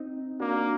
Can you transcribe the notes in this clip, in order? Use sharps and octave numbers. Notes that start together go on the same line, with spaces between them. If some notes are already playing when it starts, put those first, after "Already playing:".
Already playing: C4 D#4
A#3 D4 F#4